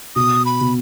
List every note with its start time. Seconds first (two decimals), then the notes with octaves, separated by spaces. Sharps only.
0.16 B2 D#6
0.46 B5
0.61 B2